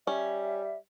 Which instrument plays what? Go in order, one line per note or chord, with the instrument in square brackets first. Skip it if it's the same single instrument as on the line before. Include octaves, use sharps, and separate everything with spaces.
[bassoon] G3 [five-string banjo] C#4 [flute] E5